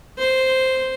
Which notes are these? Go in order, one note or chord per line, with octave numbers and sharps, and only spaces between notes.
C5